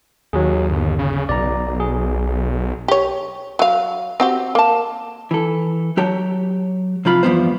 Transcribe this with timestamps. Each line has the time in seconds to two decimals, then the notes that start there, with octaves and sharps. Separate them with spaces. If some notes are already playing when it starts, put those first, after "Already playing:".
0.33 D#2 F#3 G#4
0.71 G1
0.99 C#3
1.29 B1 D5 A#5
1.80 G#4
2.88 G4 C#5
3.59 F#3 F5
4.20 C4 F#4 G4
4.55 A#3 A5
5.31 E3 A4
5.97 F#3 G4 C#5 A5
7.05 C3 F3 F4 B5
7.23 E2 G2 E3 F3 B3 C5